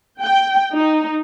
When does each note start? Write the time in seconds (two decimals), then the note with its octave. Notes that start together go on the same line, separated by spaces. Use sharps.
0.21 G5
0.74 D#4